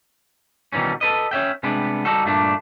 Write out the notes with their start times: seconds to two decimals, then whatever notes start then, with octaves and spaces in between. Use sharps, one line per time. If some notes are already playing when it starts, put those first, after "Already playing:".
0.72 B2 D#3 E3 G3 C#4
1.01 A4 B4 D#5
1.31 C#4 C#5 E5 G5
1.63 C3 G3 G#3 B3 D4
2.05 G3 D#4 F#4 A4
2.25 G2 A#2 A3 B3 D4